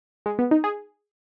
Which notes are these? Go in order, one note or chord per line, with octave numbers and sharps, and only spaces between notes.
G#3
B3
D#4
G#4